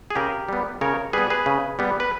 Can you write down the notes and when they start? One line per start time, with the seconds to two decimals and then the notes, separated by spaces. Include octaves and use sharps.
0.10 G#4
0.15 C#3 G4 A#4
0.49 G3 B3
0.81 C#3 A#4 C#5
1.13 G3 B3 G#4 B4
1.30 G#4 B4
1.46 C#3
1.79 G3 B3
2.00 B4